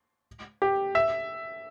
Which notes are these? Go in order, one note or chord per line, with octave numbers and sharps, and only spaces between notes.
G4
E5